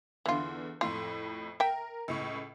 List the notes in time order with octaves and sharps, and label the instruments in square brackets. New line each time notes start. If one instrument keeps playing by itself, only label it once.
[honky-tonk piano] E2 D3 [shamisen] E3 F4
[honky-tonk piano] F2 A2 A3 [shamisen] F4
[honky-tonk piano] A#4 [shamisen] E5 G5
[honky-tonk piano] C#2 A2 C#6